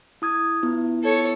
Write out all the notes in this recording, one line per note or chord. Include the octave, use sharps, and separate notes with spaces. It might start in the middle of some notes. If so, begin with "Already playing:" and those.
E4 D#6 G#6
B3 E4 F4
A4 C#5